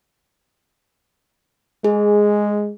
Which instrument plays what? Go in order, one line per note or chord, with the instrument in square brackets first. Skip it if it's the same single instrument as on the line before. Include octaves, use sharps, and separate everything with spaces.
[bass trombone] G#3 [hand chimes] G#4